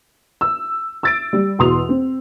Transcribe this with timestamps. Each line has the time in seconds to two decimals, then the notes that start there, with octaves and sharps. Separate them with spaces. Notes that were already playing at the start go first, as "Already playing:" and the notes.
0.41 E6
1.03 E6 A6 D7
1.33 G3
1.59 E2 B2 C6 D#6 F7
1.89 C4